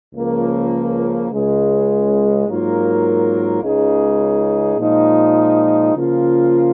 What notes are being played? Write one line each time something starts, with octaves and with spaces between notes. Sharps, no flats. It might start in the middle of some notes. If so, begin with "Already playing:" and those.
C#2 C#3 F3 A#3
C#2 C#3 G#3
G#2 F#3 A#3 F4 A#4
C#2 C#3 G#3 D#4 G#4
A#2 F3 G#3 D#4
C#3 F3 A#3 F4